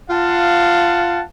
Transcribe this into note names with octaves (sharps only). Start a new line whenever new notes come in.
F4 F5 F#5 A5